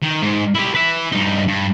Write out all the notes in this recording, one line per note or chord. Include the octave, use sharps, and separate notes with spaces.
D#3
G#2
E4 G4
B4 E5
G2 D#4
G2